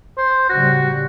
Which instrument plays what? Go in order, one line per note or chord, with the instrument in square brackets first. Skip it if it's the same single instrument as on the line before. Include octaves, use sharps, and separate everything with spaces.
[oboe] C5
[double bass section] A2 C#3 G3 [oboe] F#4